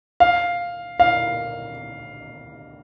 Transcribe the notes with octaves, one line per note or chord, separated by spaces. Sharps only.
F5
F5